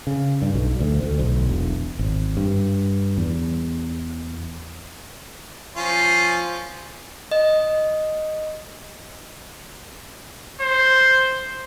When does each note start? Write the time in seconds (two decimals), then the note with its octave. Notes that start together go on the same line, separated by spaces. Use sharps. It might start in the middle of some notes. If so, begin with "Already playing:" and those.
0.07 C#3
0.42 G2
0.54 B1
0.80 D2
1.03 D2
1.19 B1
1.49 E1
1.99 G#1
2.37 G2
3.18 E2
5.76 F3 C#4 F4
7.31 D#5
10.61 C5